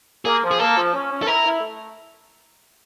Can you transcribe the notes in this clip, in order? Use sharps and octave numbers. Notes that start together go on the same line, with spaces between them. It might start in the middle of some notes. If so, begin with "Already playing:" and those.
A#3 G#4
F3
G#4
A#3 A4
F3
C#4
C#4
A4
E4 A#4
E4
A3